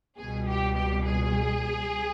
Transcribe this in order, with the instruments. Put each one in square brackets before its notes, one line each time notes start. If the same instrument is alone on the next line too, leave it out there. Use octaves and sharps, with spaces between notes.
[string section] C#2 B2 G3 G#4
G4
G4
G#4